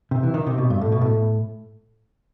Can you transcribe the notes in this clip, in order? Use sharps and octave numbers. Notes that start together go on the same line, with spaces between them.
C3
E3
D#3
C3
B2
G2
A2
B2
A2